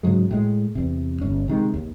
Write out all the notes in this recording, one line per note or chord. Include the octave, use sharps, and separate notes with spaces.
G#2 C#3 F#3 G#3
A2 G#3
E2 C3
G1 C#4
C3 D#3 G#3
D#2